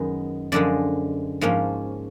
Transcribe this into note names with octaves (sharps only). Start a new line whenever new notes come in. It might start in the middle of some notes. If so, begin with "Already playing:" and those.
Already playing: F#2 D#3 G#3 B3
F#2 D3 F3 G#3 D5
G#2 F3 A#3 C#4